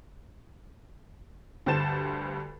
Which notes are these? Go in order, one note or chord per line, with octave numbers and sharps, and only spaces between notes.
D2 G2 C5 A5 A6 E7